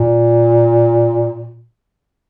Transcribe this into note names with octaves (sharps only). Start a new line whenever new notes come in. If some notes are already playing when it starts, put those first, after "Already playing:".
Already playing: A#2